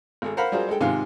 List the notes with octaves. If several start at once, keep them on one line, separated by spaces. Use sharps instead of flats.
G#1 G#4 A4
A#4 C5 F5 F#5 A#5 B5
F#3 G3 F4 G#4 A#4 C5
G#3 G#4 A4 G5
G#2 C3 D#3 F4 F5 G#5